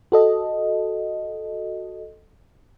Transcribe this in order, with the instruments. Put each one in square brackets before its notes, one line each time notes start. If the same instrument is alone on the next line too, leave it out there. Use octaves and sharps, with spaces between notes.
[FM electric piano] F#4 A4 D#5